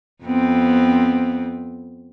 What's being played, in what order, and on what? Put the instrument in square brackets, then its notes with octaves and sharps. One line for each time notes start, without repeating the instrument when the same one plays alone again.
[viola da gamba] F2 B3 C4